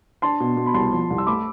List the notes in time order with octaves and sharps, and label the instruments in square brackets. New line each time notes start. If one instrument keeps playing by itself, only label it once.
[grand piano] D4 [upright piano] A5 C6
[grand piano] B2
B2
[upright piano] B5
[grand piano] C2 [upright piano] A5 C6
[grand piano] F3
C2
[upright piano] E6
[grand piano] A3 [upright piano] B5 D6